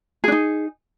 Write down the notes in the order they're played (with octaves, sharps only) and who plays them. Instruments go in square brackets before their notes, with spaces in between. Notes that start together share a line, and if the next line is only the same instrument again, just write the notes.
[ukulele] G#4
D4
D#4